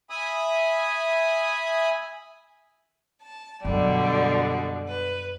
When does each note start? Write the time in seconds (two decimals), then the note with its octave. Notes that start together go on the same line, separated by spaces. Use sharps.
0.10 E5 G#5 B5 D#6
3.24 A5
3.65 F#2 B2 D3 G3
4.88 B4